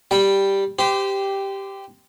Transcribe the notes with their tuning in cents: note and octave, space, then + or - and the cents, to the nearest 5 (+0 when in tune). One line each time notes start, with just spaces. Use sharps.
G3 +0 G5 +0
G4 +0 C5 -30